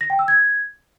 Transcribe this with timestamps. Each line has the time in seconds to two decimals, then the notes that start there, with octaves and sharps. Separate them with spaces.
0.01 A#6
0.10 G5
0.19 E6
0.28 G#6